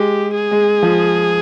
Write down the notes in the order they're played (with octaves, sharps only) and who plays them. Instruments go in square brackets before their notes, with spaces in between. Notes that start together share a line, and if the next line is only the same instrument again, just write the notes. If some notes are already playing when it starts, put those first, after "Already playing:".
Already playing: [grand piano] G#3 [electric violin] G4
[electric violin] G#4
[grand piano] G#3
F3